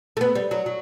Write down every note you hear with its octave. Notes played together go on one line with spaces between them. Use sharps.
A3
B3
G3
F#3
F#3